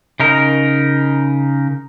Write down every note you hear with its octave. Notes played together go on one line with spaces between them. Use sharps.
C#3 D#4 A#4